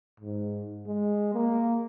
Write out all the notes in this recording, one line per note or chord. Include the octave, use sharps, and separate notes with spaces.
G#2
G#3
A#3